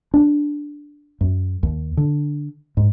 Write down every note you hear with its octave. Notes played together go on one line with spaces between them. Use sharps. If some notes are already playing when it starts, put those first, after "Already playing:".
D4
F#2
D#2
D3
G#2